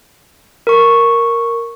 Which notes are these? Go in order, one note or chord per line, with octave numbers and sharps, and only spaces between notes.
A#4 C#6